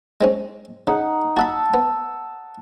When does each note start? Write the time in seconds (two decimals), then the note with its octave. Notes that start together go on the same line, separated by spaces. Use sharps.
0.21 G#3 C4 C#4
0.87 C#3 D#4 F#5
1.37 F#4 F#5 A5 B5 E6
1.74 B3